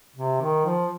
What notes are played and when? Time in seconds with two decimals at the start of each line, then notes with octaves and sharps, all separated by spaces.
0.16 C3
0.41 D#3
0.65 F3